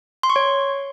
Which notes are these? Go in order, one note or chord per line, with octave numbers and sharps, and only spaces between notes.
C6
C#6
C#5